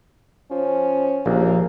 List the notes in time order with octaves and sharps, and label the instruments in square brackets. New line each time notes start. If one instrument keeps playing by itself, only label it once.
[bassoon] F3 [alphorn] C#4
[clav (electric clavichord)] A#1 [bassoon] D#2 [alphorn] A#3